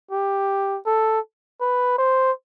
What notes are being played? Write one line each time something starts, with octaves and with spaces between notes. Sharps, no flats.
G4
A4
B4
C5